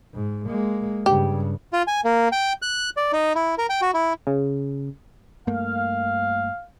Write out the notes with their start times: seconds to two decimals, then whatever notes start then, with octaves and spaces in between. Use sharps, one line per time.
0.14 G#2
0.46 G#3 A#3
1.06 G2 C#3 G4
1.73 F4
1.87 G#5
2.05 A#3
2.32 G5
2.62 F#6
2.97 D5
3.13 D#4
3.35 E4
3.58 A#4
3.70 G5
3.81 F#4
3.94 E4
4.27 C#3
5.47 G2 A3 A#3 F5